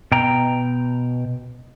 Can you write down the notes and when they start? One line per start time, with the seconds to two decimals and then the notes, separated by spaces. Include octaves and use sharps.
0.12 B2 G5 A#5